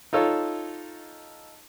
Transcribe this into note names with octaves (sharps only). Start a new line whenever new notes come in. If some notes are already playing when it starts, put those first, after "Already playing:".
D#4 F4 A4 C#5